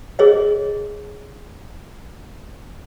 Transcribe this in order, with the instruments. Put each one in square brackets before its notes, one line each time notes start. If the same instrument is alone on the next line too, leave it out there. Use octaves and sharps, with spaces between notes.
[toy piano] G#4 C#5 D#5